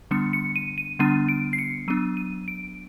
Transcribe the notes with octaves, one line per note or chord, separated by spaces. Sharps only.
D3 G3 B3 D4 C#7
C#7
D#7
D#7
D3 G3 B3 D4 D#7
D7
C7
C#7
F#3 B3 D4 D#7
D#7
D7